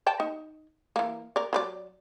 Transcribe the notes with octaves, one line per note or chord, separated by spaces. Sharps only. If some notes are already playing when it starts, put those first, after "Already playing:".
D5 G5 A5
D#4
E3 A#3
A#4 D5
F#3 B4 D5